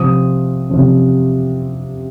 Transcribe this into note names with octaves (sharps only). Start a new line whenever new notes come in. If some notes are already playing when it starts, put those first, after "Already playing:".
Already playing: C3 F3 C4 D#6
C3 F3 C4